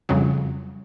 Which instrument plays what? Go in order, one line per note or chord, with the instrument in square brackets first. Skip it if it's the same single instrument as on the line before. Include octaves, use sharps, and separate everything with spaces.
[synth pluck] F2 C#3 F#3 [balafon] G3